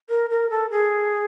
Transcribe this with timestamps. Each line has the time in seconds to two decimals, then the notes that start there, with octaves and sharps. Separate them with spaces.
0.09 A#4
0.30 A#4
0.50 A4
0.70 G#4